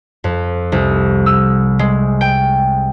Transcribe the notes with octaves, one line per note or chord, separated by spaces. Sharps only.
F2
C2
E6
G#3
G5